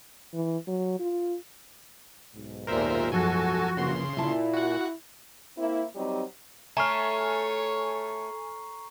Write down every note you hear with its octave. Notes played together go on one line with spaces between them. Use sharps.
E3
F#3
F4
B1 G#2
D#2 A#2 A#4 C5 E5
F#2 F3 F#4 A4 G#5
A#1 C#3 E3 A#3 C6
A#2 E4 E5 A5
F#4 F#5
A#3 C4 E4
F#3 G3 C4 D#4 G4
A3 C#5 G#5 A#5 C#6 F6 C7